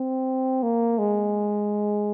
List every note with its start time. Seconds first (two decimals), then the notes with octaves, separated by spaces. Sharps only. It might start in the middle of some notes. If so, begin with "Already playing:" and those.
Already playing: C4
0.63 A#3
0.99 G#3